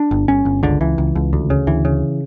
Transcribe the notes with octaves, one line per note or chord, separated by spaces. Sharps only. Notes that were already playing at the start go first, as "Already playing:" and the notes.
Already playing: D4
G1
G1 C#4
G1
C#2 D3
C#2 E3
C#2
C#2
D2
C#3
D2 E3
C#3